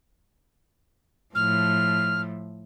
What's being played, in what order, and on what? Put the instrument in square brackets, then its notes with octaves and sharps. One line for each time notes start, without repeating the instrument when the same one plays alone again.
[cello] A2 F3 [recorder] F6